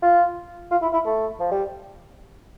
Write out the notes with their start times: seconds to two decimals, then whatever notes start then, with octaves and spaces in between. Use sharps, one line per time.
0.02 F4
0.71 F4
0.82 E4
0.93 E4
1.05 A3
1.40 F3
1.51 G3